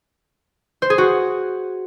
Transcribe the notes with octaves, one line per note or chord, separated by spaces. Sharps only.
C5
G#4
F#4